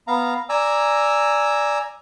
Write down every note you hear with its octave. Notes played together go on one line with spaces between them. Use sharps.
B3 F5 A#5
D5 G#5 A#5 E6